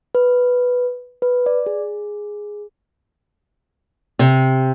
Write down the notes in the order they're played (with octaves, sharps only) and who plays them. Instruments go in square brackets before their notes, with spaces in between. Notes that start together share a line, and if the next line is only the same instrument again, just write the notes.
[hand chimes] B4
B4
D5
G#4
[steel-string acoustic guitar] C3